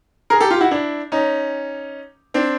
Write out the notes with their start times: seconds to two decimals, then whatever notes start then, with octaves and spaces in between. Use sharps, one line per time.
0.30 G#4 A#4
0.40 G4 A4
0.50 F4 G4
0.61 E4 F#4
0.71 D4 E4
1.12 C#4 D#4
2.34 C4 D4